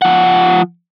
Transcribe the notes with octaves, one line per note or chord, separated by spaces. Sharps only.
F3 F#5